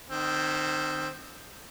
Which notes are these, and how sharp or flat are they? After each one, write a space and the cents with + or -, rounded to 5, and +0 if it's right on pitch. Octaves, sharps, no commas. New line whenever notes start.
D#3 -30 C4 +0